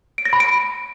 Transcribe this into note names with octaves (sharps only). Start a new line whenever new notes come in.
D7
A#6
B5
D7